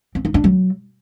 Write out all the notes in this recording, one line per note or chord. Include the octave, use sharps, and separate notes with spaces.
C4
D#4
D4
F#3